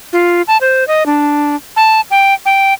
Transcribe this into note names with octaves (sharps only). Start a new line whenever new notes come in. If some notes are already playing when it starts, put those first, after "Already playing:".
F4
A5
C5
D#5
D4
A5
G5
G5